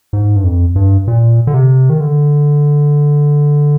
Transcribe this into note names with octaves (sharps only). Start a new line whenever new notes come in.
G#2
G2
F2
G2
A#2
D3
C3
D#3
D3